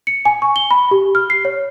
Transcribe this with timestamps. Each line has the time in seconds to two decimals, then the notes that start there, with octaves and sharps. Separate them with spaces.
0.07 C#7
0.25 G#5
0.42 C#6
0.56 G7
0.71 B5
0.91 G4
1.15 F6
1.30 C7
1.45 C#5